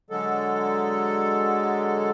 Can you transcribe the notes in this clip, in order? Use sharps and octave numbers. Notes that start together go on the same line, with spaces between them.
D3 F#3 G#3 A4